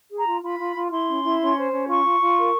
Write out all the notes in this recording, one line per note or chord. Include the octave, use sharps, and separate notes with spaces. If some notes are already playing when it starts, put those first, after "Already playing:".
G#4
A#5
F4
F4 B5
F4
F4
E4 C6
C#4
E4
C#4
C5
C#4
F4 C#6
F4
F4
A#4